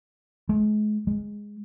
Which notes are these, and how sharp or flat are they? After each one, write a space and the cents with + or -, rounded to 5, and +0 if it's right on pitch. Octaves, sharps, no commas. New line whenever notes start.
G#3 +35
G#3 -5